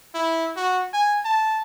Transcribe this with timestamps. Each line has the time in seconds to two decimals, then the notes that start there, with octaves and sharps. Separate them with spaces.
0.15 E4
0.56 F#4
0.93 G#5
1.25 A5